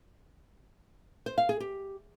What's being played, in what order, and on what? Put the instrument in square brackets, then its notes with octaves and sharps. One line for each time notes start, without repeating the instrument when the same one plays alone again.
[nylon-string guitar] C5
F5
G#4
G4